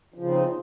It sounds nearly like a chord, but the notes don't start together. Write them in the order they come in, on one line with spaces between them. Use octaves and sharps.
F3 C#3 C4 D#4